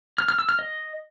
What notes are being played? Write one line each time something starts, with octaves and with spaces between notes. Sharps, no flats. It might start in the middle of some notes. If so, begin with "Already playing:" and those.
F6
F6
E6
F6
D#5